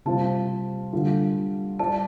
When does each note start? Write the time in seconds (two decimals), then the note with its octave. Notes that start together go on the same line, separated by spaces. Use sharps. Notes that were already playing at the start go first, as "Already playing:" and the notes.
0.05 C3 G3 F4 C5 A5
0.93 D3 G3 F4
1.79 G3 F4 D5 A5